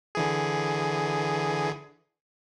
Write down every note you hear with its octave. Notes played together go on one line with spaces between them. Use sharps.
D3 E3 G#4